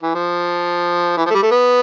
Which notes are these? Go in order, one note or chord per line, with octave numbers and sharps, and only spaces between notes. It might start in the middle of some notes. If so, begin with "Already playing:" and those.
E3
F3
E3
F3
A3
G3
A3
B3